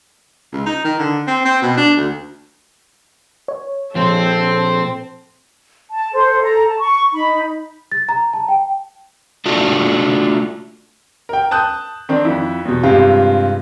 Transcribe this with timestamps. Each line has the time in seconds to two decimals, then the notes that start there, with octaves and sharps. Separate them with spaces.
0.53 C#2
0.66 D#4
0.84 D#3
0.99 D3
1.27 C4
1.45 C4
1.62 B2
1.77 D4
1.97 D2
3.48 C#5
3.95 A#2 F3 C4 A4
5.92 A5
6.14 A4 C5
6.41 A4 A#5
6.67 A5
6.79 C#6
7.12 D#4 B5
7.92 A6
8.09 A#5
8.33 A5
8.48 G5
9.46 A3 D4 F4 F#4
11.29 A#4 G5
11.51 A5 D#6 F#6 G6
12.09 D#3 C4 D4
12.25 F2 E4
12.65 E2 B2
12.83 G2 C3 G#3 C4 F4